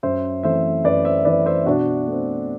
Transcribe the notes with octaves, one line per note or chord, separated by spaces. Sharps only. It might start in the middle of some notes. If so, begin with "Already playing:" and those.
F#2 C5 E5
E3 A3 C4 C5 E5
F#2 B4 D5
C5 E5
E3 A3 C4 B4 D5
C5 E5
B2 D4 F#4
A3 C4